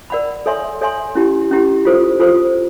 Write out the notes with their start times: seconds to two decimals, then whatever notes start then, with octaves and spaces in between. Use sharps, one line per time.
0.10 A#4 D5 F#5 B5
0.46 A4 C#5 E5 G#5 C6
0.81 A4 C#5 E5 G#5 C6
1.15 C#4 E4 G4
1.51 C#4 E4 G4
1.85 F4 A4 C5
2.20 F4 A4 C5